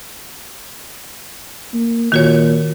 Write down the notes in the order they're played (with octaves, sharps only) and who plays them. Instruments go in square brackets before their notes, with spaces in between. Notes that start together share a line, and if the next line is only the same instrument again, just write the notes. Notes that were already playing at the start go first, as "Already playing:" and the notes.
[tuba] A#3
[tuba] A#2 [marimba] D#3 F#4 C#5